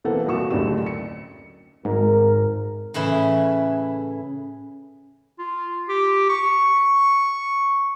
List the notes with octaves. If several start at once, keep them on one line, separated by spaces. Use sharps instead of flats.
B2 E3 A#3 C4 A4 F#5
C2 A#2 F#4 C#6 E7
F#1 D2 A2 G4 D5 E7
C#7
G#1 G#2 A#4
A2 C#3 E3 E4
F4
G4
C#6